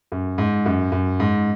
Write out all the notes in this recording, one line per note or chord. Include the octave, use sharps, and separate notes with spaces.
F#2
G#2
F#2
F#2
G#2